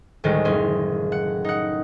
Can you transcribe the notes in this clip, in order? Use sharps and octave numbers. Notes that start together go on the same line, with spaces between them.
D2 A2 D#3 G3 G#3
F#1 C#4 C6
F#5
D#4 F#5